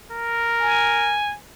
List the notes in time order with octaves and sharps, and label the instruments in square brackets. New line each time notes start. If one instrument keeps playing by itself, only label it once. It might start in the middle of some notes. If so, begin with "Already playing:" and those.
[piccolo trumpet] A#4
[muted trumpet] G#5